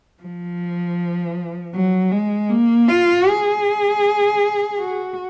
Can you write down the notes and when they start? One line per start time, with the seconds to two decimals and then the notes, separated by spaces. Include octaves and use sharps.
0.23 F3
1.75 F#3
2.12 G#3
2.50 A#3
2.89 F4
3.27 G#4
4.79 F#4